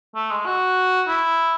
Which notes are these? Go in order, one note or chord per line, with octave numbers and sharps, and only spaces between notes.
A3
G#3
F#4
E4